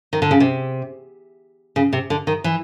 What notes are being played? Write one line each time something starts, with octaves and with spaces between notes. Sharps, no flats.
D#3
D3
C#3
C3
C#3
C3
D3
D#3
E3